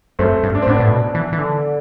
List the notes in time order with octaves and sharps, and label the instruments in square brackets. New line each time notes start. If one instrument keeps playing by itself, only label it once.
[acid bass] F#2 [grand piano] A3 C4
[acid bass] G2
[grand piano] D4
C4
[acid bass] A2 [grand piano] B3 D4
[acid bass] A2
B2
E3
E3
D3